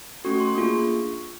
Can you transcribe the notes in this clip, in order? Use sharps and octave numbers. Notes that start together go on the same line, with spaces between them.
A3 C#4 F#4 A4 C#6
C6
A#3 D4 F4 G#4 C#6